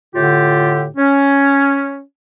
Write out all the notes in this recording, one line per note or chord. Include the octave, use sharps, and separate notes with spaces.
A2 D3 F4 G4
C#4